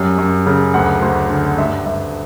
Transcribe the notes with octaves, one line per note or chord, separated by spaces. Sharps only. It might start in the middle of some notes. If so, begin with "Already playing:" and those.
Already playing: F#2 G3
F#2
C#3
D2 F#5
D2
D3
G2 E5
G2 E5